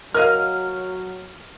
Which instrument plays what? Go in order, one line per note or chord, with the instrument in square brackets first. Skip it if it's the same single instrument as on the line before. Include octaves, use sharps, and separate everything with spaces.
[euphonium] F#3 [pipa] A#4 D#5 F5 [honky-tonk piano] F6